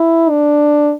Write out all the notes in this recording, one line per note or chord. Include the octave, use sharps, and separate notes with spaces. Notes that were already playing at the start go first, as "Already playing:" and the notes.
Already playing: E4
D4